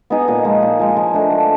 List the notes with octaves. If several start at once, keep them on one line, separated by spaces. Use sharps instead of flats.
B3 D#4 G#4
A#2
F3 G#3
A#2
F3 G#3
F3
A3 D4
F3